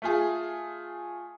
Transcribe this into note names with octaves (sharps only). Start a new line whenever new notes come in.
A3 F4 G#4